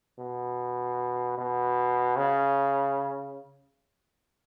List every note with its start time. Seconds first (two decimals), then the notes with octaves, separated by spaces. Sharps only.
0.19 B2
1.38 B2
2.17 C#3